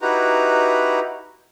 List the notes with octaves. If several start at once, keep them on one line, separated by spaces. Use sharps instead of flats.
D#4 E4 F#4 G4 B4 A#5